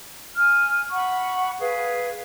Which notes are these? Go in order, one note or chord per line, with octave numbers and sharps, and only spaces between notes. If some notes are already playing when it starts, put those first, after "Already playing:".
G#5 F6
F#5 B5 C#6
G#4 B4 F5